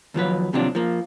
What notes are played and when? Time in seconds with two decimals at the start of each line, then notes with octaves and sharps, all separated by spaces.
0.14 D#2 F3 F#3 B4
0.53 D#2 C3 F3 F#3 C4 D4
0.75 F3 A#3